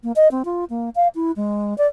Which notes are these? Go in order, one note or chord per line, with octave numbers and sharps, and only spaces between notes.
A#3
D#5
C4
F4
A#3
F5
E4
G#3
D5